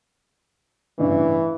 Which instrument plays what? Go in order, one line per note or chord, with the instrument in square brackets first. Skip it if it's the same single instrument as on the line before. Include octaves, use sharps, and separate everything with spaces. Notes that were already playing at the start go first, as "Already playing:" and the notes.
[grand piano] A1 G2 C#3 [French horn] E3